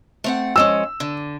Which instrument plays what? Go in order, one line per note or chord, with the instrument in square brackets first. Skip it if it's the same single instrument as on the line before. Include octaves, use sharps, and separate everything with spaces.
[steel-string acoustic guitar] A3 C4 F#5
[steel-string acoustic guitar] F3 G#3 C#4 [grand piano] E6
[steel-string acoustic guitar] D3